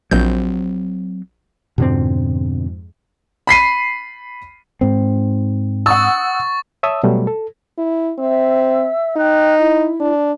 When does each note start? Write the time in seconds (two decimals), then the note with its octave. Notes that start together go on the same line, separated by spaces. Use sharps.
0.11 A#1 F#3 C4 G6
1.78 F2 G#2 B2 D3 C4
3.47 B5 B6 C7 D#7
4.81 G#2 C4
5.86 F#5 C#6 D#6 E6 A6
6.83 C#5 E5 A5 D#6 E6
7.03 B2 F#3 G3 A3
7.27 A4
7.78 E4
8.19 C4 E5 E6
9.17 D#4 G5 F#6
9.59 E4
10.00 D4